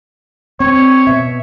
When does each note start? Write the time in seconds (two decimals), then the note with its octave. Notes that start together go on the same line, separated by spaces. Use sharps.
0.60 C4 C#5
1.07 B2 E5